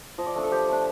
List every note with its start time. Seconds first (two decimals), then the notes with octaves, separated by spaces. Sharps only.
0.18 F3 D#5
0.27 D5
0.36 A3 D4
0.43 A4
0.52 F3 G4
0.68 A3 D4